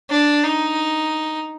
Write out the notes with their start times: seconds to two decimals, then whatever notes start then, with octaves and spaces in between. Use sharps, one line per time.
0.10 D4
0.44 D#4